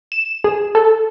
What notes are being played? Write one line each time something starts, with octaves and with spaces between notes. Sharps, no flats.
E7
G#4
A4